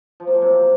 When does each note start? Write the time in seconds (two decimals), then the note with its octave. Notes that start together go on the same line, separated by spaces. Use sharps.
0.20 F3
0.27 A#3
0.35 F#3
0.42 C3